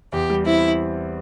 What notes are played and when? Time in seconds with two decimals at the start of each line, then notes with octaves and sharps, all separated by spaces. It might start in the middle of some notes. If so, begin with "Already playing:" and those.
0.12 E2 G4
0.30 G3
0.46 C4 E4